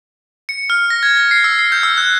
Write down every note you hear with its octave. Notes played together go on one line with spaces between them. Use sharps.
C#7
F6
A#6
G#6
A#6
C7
E6
C7
G6
E6
F#6